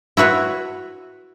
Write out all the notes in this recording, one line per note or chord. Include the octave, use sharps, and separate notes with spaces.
E4 F#4 B4 C#5